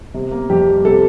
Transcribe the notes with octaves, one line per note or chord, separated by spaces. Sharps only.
C3
A#3
F2 G4
G3
C3 A4